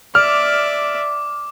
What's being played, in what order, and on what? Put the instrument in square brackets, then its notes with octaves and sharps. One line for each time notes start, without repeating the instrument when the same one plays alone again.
[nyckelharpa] D5 E5 [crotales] D6 [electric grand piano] F6